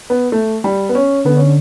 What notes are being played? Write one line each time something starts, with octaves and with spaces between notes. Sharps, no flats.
B3
A3
G3
B3
C#4
D3 B3
C#4